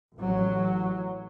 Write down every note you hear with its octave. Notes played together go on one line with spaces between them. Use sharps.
A1 F#3